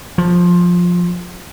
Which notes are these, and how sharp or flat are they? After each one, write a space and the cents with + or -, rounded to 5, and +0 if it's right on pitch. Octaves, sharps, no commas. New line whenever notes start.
F3 +15